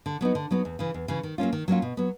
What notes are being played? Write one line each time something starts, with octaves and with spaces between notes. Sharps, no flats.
D3
F#3 B3 D#4
D3
F#3 B3 D#4
E2
C#3 E3
E2
C#3 E3
D#3
F#3 A#3 C#4 F4
D#3
F#3 A#3 C#4 F4
B2
F#3 B3